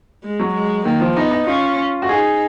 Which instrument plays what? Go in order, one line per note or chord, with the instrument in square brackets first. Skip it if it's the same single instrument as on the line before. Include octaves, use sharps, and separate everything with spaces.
[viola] G#3
[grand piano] F#3
[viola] G#3
[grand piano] D#3 [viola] A#3
[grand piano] F3
[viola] B3 [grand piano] D#4
[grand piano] D#4
[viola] C#4 [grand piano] F4
[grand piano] F#4
[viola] D#4 [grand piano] G#4